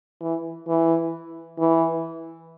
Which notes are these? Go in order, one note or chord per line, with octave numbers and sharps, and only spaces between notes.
E3
E3
E3